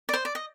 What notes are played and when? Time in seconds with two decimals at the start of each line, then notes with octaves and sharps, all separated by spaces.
0.09 D5
0.13 C5
0.25 D5
0.35 D#5